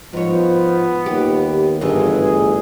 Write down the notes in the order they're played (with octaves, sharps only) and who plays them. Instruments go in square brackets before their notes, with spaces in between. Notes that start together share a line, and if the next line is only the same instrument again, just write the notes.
[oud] G#2 C#5 [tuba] F3 [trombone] B3
[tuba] D#2 [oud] G4
[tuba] G1 [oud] D2 G#2 E3 [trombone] G#4